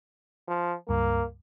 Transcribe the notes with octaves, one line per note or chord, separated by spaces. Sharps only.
F3
C#2 G2 A#3